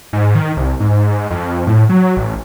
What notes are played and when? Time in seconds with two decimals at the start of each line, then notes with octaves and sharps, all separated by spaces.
0.13 G#2
0.35 D#3
0.57 C2
0.80 G#2
1.30 F2
1.67 A2
1.89 F#3
2.17 A1